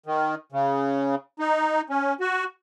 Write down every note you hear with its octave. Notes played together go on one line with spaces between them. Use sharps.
D#3
C#3
D#4
C#4
F#4